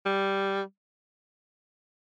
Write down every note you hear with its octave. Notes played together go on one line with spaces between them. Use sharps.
G3